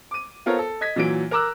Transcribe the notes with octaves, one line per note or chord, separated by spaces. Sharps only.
D6 D#7
B3 F4 A4 A#4 C5 C#5
A4
D#5 G#6 B6
A#2 E3 F#3 D7
A#4 A#5 D6 E6 F#6